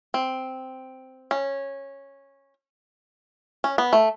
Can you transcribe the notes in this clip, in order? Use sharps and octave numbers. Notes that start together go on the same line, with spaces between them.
C4
C#4
C#4
B3
A3